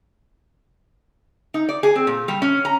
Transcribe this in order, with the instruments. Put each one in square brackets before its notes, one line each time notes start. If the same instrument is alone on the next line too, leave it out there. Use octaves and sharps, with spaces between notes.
[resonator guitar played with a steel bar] D#4
D5
G#4
C4
A#2
G3
C#4
A#5